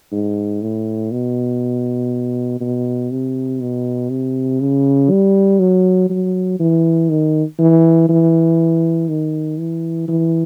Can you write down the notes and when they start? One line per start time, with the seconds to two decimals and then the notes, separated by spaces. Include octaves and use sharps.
0.12 G#2
0.62 A2
1.12 B2
2.61 B2
3.11 C3
3.61 B2
4.10 C3
4.61 C#3
5.11 G3
5.60 F#3
6.10 F#3
6.60 E3
7.10 D#3
7.59 E3
8.09 E3
9.09 D#3
9.59 E3
10.08 E3